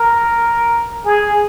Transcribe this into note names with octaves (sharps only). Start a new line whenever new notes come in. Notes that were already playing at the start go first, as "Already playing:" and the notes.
Already playing: A#4
G#4